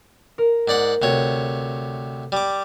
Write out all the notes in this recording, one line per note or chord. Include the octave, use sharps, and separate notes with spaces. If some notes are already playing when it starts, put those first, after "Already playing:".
A#4
G#2 D5 F#5
D2 C3 C#5
G3 D6